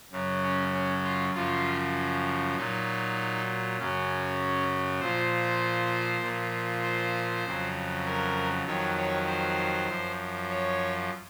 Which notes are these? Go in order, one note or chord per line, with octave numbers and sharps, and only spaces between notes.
F#2 C#3 F#3
C#4
C#4
F4
F#2 C#3 F3 F4
A#2 F#3 D#4
F#2 C#3 F#3 C#4
A#2 F3 C5
A#2 F3
C5
F2 C#3 F#3
A#4
F2 D#3 F#3 C#5
C#5
C5
F#2 F3
C#5